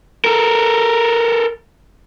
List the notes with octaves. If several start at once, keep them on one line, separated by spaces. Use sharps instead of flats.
A4 A#4